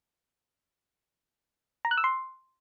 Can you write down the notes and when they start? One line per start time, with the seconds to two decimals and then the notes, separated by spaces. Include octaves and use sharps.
1.85 A#5
1.91 F#6
1.98 E6
2.04 C6